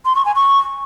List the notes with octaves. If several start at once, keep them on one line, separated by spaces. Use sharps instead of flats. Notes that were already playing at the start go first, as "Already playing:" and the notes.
C6
C#6
G#5
C#6